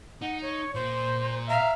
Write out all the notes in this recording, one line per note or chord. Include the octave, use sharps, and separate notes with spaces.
D#4 F#5
C#5
A#2 C5
E5 F5 A#5